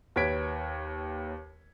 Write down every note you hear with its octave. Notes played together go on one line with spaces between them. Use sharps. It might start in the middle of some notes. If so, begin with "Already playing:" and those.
D#2 B4 C#5 G#6 B6 D7